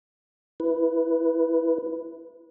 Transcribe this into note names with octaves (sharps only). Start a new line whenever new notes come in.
E4 B4